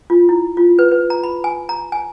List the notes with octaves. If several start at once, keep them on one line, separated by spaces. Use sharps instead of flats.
F4
E4
F4
B4
B4
A#5
B5
G#5
A#5
G#5